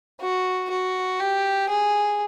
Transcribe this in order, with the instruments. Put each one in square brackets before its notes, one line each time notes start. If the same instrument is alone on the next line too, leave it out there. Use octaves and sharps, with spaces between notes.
[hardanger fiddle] F#4
F#4
G4
G#4